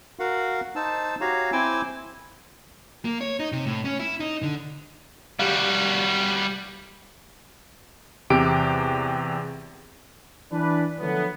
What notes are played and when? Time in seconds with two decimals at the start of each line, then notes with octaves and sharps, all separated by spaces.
0.19 F#4 A#4 F5 F#5
0.76 D#4 C5 A5 E6
1.21 F#4 G4 C#5 F5 A#5
1.52 C4 E4 G5 G#5 D6 E6
3.05 A#3
3.21 C#5
3.39 D#4
3.52 C3
3.66 A2
3.85 C#4
3.99 E4
4.20 D#4
4.43 D3
5.39 G3 F#4 G4 F5
8.30 E2 C3 G4 D7
10.52 E3 D4 B4
11.00 D3 F3 F#3 A3 B3